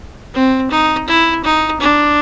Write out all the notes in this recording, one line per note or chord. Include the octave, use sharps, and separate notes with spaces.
C4
D#4
E4
D#4
D4